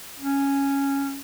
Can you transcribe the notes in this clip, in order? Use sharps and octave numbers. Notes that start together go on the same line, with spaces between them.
C#4